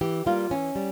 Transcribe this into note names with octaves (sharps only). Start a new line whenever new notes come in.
E3 G4
G3 A#3 F4
E3 C#4
G3